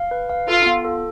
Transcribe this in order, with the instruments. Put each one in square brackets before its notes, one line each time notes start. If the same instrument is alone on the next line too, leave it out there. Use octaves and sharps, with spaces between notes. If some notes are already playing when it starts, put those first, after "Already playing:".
Already playing: [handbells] F5
B4
F5
[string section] F4 [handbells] A4
[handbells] B3
A4